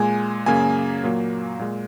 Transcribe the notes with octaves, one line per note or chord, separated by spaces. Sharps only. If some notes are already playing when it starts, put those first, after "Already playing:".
Already playing: A#2 G#3 G#5
F#2 C#3 A#3 G#5
A#2 F#3 A#3
A#2 G#3